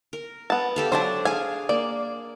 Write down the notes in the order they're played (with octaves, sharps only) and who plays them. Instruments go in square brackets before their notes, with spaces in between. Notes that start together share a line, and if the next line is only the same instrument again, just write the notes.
[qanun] A#4
[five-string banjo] B3 A5
[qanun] G4 A4 F5
[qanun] F#3 D4 D5 [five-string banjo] C5 A5
[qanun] G#4 F5 [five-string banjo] G#5
[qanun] A#3 [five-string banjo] D5